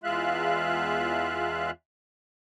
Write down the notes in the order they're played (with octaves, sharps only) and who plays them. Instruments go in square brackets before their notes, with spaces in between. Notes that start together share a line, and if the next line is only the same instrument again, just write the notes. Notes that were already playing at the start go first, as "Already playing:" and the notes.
[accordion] E2 G#3 F4 E5 F5 F#6